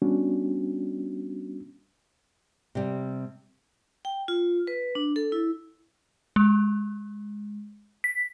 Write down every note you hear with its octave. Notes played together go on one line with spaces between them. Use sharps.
G3 B3 C#4 D4 F#4
C3 G3
G5
F4
B4
D4
A4
E4
G#3
B6